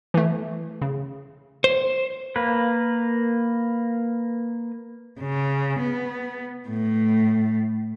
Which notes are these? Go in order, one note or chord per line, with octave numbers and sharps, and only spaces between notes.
E3 A3
C#3
C5
A#3 B4
C#3
B3
A2